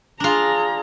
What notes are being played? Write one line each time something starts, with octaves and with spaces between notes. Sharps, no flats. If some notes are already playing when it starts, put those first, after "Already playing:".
D4 F4 G#4 A#5